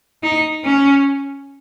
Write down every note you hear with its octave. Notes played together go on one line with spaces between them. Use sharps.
D#4
C#4